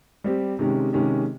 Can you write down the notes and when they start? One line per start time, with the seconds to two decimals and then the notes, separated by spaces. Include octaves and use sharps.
0.24 G3 C4 G4
0.59 C3 D#3 G#3 C#4 G4
0.93 C3 D#3 G#3 C#4 G4